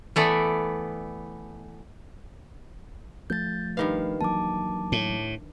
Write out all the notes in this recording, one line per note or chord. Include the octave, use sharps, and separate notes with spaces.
E3 A3 B3 D5
F3 A3 G6 A6
G2 D#3 B4 F5
E3 F#3 A#3 A5 D6
A2